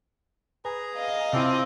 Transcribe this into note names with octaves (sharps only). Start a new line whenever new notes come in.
G#4 B4 A#5
D#5 F5
C3 C4 E4 F4 A4 D5